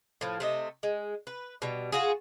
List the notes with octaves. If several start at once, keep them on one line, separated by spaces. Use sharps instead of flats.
A2 F3
C3 A3 D#5
G#3
B4
B2 G3
F4 F#4 G#4